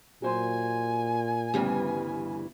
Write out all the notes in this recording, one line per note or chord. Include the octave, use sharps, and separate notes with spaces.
A#2 F#3 C5 G#5 C6
D2 G2 C#3 E3 G3 B3